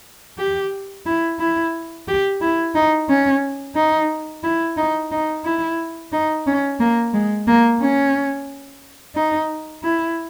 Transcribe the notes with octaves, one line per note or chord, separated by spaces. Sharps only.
G4
E4
E4
G4
E4
D#4
C#4
D#4
E4
D#4
D#4
E4
D#4
C#4
A#3
G#3
A#3
C#4
D#4
E4